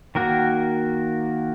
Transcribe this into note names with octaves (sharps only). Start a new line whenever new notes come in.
D#3 A#3 F#4 A#4